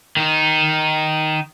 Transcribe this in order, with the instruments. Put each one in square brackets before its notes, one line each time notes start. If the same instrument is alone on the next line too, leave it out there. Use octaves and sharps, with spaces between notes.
[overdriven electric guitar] D#3 D#4